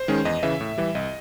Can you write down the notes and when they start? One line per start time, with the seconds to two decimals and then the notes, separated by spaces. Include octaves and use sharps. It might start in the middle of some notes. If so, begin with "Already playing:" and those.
Already playing: C5
0.08 D#3 G#3 C#4
0.25 E2 D#5
0.43 C#3 E3 E5
0.61 A2
0.78 E3 G3
0.95 C2 D#5